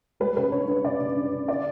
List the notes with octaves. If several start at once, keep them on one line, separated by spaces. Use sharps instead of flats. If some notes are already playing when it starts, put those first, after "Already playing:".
G3 B4
C#3 B4
D4 C#5
D4 C#5
C#3 D5
C#3
D4
C#3
D3 D5